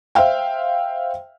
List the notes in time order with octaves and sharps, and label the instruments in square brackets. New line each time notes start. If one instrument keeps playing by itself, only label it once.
[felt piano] C5 E5 F5 G5